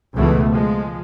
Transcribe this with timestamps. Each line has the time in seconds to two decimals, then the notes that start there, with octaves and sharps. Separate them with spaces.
0.14 C#2 B2 E3 A3
0.50 F3 G#3